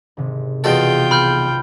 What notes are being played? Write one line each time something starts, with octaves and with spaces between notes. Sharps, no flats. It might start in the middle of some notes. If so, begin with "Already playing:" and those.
G#1 C3
E2 B2 F4 A4 G5
B1 B5 F6 G6